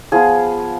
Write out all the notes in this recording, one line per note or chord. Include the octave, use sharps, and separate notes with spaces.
F3 B3 F4 G#4